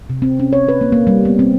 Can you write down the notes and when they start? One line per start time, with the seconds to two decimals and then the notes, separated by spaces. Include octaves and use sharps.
0.10 C3
0.22 C4
0.39 C#4
0.53 C#5
0.68 B4
0.81 A#3
0.92 A#3
1.07 G3
1.25 B3
1.39 C4